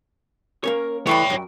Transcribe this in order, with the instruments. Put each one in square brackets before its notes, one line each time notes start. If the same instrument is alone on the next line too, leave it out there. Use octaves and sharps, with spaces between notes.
[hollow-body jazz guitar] A#3 C#4 C#5 [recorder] A#4
[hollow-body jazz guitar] E3 A3 [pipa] G3 E5 C#6 [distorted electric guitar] C#5 G5 [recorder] B5
[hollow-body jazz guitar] F#2